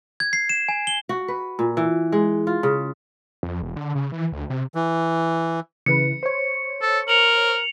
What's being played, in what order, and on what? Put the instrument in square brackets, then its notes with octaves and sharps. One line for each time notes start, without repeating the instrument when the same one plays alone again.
[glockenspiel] G#6
C7
E7
G#5
G7
[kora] F#4
B4
A#2
E3
G#3
F4
C#3
[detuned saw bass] F2
E1
D3
C#3
E3
D2
C3
[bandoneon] E3
[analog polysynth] C#3 E3 B4 [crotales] C#7
[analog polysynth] C5 C#5
[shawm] A4
[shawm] A#4 [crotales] C#7 F7 F#7